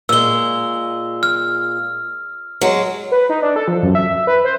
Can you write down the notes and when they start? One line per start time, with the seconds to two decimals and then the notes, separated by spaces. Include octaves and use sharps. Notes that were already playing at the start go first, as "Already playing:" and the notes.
0.09 A#2 G#3 E6 G7
1.23 F6
2.61 F#3 G#3
3.12 B4
3.29 D#4
3.42 D4
3.56 A4
3.68 F3
3.83 F#2
3.95 E5
4.07 E5
4.27 B4
4.45 C5